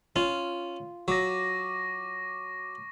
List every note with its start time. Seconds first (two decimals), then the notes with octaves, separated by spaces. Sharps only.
0.16 C#4 F4
1.08 F#3 C#6 D6 A#6